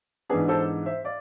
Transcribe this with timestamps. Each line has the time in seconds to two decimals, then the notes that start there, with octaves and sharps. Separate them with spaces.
0.29 G#2 E3 B3 D4 G#4 B4
0.48 A4 C5
0.86 C5 E5
1.04 D5 F5